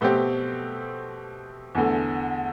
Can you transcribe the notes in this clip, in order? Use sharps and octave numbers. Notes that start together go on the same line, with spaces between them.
B2 A3 C4 G4
E2 D3 A3